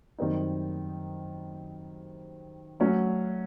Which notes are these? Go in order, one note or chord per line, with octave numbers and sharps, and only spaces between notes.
F#2 D#3 G3 C4 D#4
F#3 A3 C#4 F#4